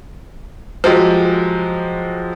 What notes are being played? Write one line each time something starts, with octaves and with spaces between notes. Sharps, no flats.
F3 F#3 G#3 G4